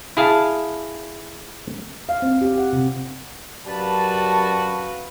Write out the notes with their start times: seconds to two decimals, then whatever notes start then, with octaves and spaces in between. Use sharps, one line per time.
0.17 E4 G#4 F5 A5
2.09 F5
2.22 C4
2.41 G4
2.58 F#5
2.73 C3
3.66 F#2 F#4 G4 B4 D5 F5 A5